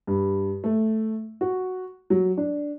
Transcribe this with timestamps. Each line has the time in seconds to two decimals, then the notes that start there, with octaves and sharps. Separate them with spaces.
0.07 G2
0.64 A3
1.41 F#4
2.10 F#3
2.37 D4